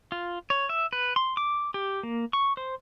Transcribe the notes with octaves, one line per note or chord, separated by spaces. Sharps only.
F4
C#5
E5
B4
C6
D6
G4
A#3
C#6
C5